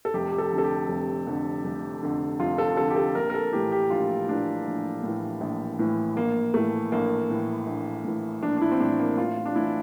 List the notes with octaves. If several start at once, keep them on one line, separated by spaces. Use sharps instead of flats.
A4
F1 G4
G4
A4
F2 D3
A4
G4
F1
F2 D3
F1
F2 D3
F1 F4
A4
F2 D3 A4
G4
A4
A#1 A#4
A#4
A4
A2 E3 G4
G4
A#1 F4
A2 E3 D4
A#1
A2
E3
A#1
A2 E3
A#1 A#3
A2 E3 A3
A#1 A#3
A2 E3
A#1
A2 E3
A#1 D4
D4
E4
C4
A2 E3 D4
A#3
A1 F4
D4
A2 E3 E4